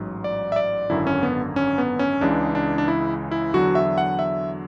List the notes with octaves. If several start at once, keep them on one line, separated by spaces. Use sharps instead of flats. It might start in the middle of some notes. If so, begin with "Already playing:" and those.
Already playing: A1 G#2 F#3
D5
E5
D5
G#1 F#2 D3 E4
C#4
B3
C#4
B3
C#4
C#2 C#3 E3 G#3 D4
D4
D4
E4
E4
E2 D3 F#3 F#4
E5
F#5
E5